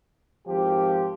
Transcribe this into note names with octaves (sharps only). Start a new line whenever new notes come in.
G#1 F3 G4